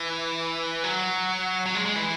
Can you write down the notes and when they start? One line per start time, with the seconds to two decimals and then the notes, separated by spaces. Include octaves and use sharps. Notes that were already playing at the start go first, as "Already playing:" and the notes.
Already playing: E3
0.84 F#3
1.66 F#3
1.75 G#3
1.86 G#3
1.96 E3